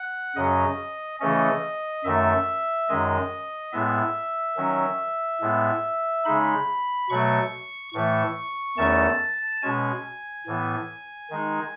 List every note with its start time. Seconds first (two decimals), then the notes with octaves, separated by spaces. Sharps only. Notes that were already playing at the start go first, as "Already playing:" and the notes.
Already playing: F#5
0.36 F#2 C#3 F#3 C#4 D#5
1.20 C#3 E3 A3 C#4 D#5
2.04 F#2 D#3 A3 E5
2.89 F#2 D#3 G#3 D#5
3.73 A2 G#3 B3 E5
4.57 D#3 F#3 C#4
5.41 A2 G#3 B3
6.25 C#3 G#3 D#4 B5
7.10 B2 F#3 A3 C#6
7.93 A2 E3 A3 C#6
8.78 E2 D#3 A3 C#4 A5
9.62 B2 G#3 C#4 G#5
10.47 A2 E3 B3
11.30 D#3 G#3 D#4